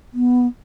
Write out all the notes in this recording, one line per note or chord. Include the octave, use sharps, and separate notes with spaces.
B3